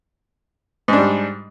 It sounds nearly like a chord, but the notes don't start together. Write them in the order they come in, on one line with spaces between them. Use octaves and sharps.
G#2 D4 G3